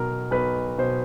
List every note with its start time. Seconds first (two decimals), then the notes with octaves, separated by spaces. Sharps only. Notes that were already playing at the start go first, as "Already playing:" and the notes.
Already playing: B1 B2 A#4
0.31 B1 B4
0.78 B2 C5